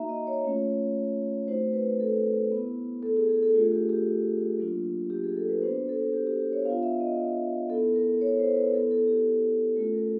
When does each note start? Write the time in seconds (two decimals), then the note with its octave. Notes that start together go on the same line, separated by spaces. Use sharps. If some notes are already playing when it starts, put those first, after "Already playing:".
Already playing: A#3 D#4 F#4 E5 A#5
0.09 D#5
0.27 C#5
0.44 A3 C#4 F4
1.48 A3 C4 D#4 F#4 C5
1.73 B4
2.00 A4
2.52 B3 E4
3.03 A4
3.17 G#4
3.29 G#4
3.43 A4
3.55 A3 D4 F4 G#4
3.72 G4
3.89 G4
4.59 F#3 A#3 D4 F4
5.10 G4
5.24 G#4
5.37 A4
5.49 B4
5.62 B3 D4 F#4 C5
5.89 A4
6.14 G4
6.27 G4
6.40 G4
6.53 C#5
6.65 B3 D4 F4 F5
6.83 E5
7.00 D#5
7.69 B3 A4
7.74 E4
7.96 A#4
8.21 C#5
8.39 C5
8.56 B4
8.73 B3 E4 A4
8.91 A4
9.08 G4
9.76 A3 C#4 F4 A4
9.94 A#4